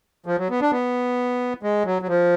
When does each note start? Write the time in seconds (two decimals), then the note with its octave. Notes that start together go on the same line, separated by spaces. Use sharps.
0.26 F3
0.38 F#3
0.50 B3
0.61 D4
0.72 B3
1.63 G#3
1.85 F#3
2.02 F#3
2.08 F3